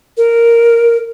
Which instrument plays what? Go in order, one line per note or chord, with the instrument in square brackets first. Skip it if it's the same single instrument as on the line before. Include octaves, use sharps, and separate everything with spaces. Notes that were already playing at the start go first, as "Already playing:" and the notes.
[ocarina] A#4